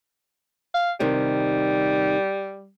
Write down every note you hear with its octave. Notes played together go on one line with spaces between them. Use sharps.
F5
C3 D#3 G3